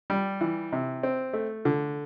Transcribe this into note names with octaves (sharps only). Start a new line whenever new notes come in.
G3
E3
C3
C4
A3
D3